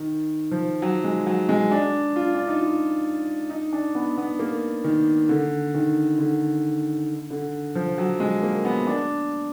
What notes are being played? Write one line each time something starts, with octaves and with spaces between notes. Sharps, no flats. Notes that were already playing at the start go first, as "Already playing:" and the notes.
Already playing: D#3
F3
F#3
G#3
F#3
G#3
D4
F4
D4
D#4
F4
D#4
D4
B3
B3
A#3
D#3
D3
D#3
D3
D3
F3
F#3
G#3
A#3
B3
D4